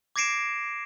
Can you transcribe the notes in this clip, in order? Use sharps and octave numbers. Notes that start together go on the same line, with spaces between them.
D6 G#6 A#6 C7 D7 E7